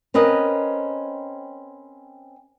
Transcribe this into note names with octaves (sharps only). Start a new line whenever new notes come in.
C4 C#4 A#4 B4 D#5